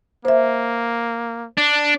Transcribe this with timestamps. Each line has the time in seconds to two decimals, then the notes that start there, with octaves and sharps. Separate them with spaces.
0.25 A#3 C5 E5
1.57 D4